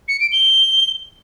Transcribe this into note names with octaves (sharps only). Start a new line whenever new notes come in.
C#7
D7
G7